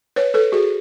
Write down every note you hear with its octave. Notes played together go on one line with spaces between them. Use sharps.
B4 C#5
A4 B4
F#4 G#4